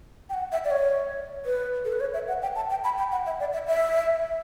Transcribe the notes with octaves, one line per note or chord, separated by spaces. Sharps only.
G5
F#5
E5
D5
C#5
B4
A4
B4
C#5
E5
F#5
G5
A5
G5
B5
G5
F#5
E5
D5
E5
E5